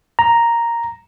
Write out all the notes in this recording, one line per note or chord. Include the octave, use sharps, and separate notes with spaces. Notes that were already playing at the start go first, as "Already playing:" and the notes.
A#5